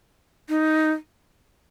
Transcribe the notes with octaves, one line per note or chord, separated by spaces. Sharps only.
D#4